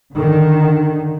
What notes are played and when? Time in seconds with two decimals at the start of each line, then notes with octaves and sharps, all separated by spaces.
0.11 D3 D#3